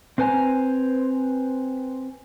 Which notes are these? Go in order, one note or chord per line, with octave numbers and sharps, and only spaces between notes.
C4 B4 C5 G#5 A#5